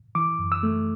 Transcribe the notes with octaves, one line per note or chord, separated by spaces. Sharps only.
E3 D6
F#2
E6
A3